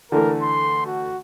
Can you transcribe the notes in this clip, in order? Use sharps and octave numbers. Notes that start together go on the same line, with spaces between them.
D3 E3 A3 A#4
C6
F#4